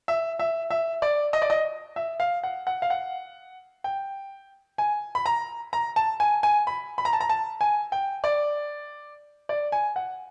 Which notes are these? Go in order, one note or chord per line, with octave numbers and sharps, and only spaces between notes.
E5
E5
E5
D5
D#5
D5
D#5
E5
F5
F#5
F#5
F5
F#5
G5
G#5
B5
A#5
A#5
A5
G#5
G#5
B5
B5
A#5
A5
A#5
A5
G#5
G5
D5
D5
G#5
F#5